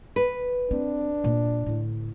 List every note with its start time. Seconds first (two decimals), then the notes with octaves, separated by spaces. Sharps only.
0.16 B4
0.71 C4 D4
1.24 A#2
1.66 A2 D3